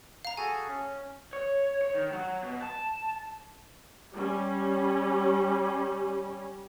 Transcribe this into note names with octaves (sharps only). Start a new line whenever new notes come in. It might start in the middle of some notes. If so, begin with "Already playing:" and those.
F5 A#5
F#4 G#4 A4 G#5
C#4
C#5
C#5
D#3
F#3
B2
A5
G3 C#4